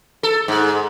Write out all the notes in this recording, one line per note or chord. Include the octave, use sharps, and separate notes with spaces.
A4
G#2